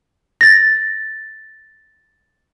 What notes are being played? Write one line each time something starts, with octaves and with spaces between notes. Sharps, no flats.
A6 A#6